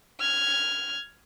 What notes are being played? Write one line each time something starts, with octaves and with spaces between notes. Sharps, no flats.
F6 G#6